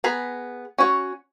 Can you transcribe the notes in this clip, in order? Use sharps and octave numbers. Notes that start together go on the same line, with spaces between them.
B3 G#4 A#5 B5
C#4 F#4 C#5